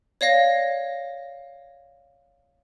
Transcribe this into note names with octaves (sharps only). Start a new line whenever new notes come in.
C#5 D5 F5 A#6